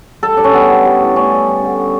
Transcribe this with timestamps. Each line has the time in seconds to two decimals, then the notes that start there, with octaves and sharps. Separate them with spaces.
0.23 G3 A4
0.37 G3 D4
0.44 C#4
0.54 G3 B3
0.69 G3
0.85 G3
1.00 A2
1.16 G3 C#4
1.31 G3
1.47 G3
1.63 D3